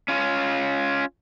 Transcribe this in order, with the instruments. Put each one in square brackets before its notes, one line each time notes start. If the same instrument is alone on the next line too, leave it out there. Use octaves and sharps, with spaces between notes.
[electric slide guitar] C#4 F4